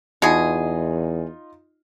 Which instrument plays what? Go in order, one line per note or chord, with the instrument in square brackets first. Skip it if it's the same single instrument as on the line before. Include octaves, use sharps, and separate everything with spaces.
[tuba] E2 [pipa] B2 G#4 [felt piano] D#4 F4